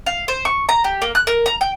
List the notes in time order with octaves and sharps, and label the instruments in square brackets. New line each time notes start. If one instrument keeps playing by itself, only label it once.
[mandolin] F5
C5
C#6
A#5
G4
A#3
F#6
A#4
A#5
G5